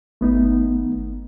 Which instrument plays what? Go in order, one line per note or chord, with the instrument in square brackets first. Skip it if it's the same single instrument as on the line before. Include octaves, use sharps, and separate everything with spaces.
[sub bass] G#1 [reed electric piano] A3 B3 D#4